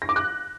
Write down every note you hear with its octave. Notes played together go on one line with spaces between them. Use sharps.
A#6
D6
F#6